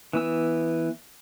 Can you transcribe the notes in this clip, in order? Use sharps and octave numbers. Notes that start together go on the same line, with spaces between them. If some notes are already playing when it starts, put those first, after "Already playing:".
E3 B3 E6